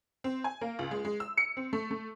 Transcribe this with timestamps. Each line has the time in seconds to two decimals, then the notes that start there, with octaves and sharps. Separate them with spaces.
0.24 C4
0.44 G#5
0.61 A#3
0.79 C#2
0.91 G#3
1.05 G#3
1.20 E6
1.37 C#7
1.57 C4
1.73 A3
1.91 A3